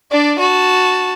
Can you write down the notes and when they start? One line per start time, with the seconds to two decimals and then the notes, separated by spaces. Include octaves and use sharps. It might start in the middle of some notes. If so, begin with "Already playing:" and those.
0.11 D4 D5
0.39 F#4 A5